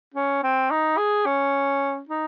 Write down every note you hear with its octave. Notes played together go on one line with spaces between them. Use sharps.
C#4
C4
D#4
G#4
C#4
D#4